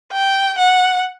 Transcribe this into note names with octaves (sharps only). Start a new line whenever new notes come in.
G5
F#5